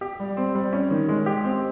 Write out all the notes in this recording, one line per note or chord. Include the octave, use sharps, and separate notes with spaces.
G4
G3
C4
G3
C#4
D#3
G#3
G4
C4